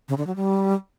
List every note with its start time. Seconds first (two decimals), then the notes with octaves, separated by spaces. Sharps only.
0.09 C#3
0.18 D3
0.27 F#3
0.36 G3